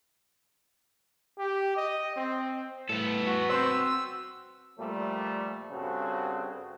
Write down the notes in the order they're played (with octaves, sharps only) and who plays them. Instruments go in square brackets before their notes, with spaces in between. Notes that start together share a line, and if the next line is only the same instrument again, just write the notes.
[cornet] G4
D#5
C4
[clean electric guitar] A2 [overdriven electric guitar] B3 A4
[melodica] F#4
[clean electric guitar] C4 F#4 C5 [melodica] E6
[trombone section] A#2 F3 G3 A3
G2 C#3 C4 F#4 A4